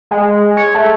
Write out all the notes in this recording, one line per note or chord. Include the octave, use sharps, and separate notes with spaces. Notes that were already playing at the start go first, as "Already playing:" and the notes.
G#3
C#5
A3